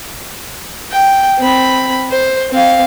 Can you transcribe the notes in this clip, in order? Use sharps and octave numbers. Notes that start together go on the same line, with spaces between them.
G5
C4 B5
C5
C4 F5